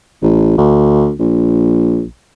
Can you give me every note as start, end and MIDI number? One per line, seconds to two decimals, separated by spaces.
0.22 0.53 33
0.58 1.13 38
1.19 2.04 34